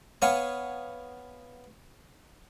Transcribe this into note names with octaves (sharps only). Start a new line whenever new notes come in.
B3 C#5 F5 G#5 C#6